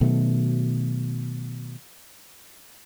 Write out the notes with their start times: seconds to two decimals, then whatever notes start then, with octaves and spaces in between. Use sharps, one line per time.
0.01 B2 D#3 F#3 A3